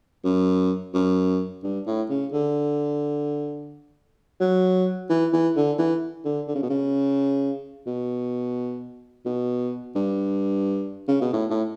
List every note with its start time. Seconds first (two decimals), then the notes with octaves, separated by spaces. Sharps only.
0.24 F#2
0.94 F#2
1.64 G2
1.86 A2
2.10 C#3
2.33 D3
4.40 F#3
5.10 E3
5.33 E3
5.56 D3
5.79 E3
6.25 D3
6.48 D3
6.55 C#3
6.63 B2
6.70 C#3
7.87 B2
9.25 B2
9.95 G2
11.08 C#3
11.21 B2
11.33 A2
11.51 A2